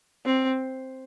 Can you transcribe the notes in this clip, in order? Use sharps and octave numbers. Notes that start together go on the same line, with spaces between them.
C4